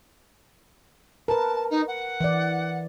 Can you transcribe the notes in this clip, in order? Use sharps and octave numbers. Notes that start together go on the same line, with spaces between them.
A#4 B4 A5
D#4
F#5
E3 D5